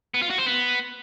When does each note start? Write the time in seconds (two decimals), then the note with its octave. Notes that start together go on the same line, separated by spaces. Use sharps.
0.14 B3
0.22 F4
0.30 F#4
0.38 C5
0.46 B3